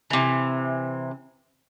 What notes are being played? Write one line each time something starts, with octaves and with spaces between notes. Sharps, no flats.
C3 E3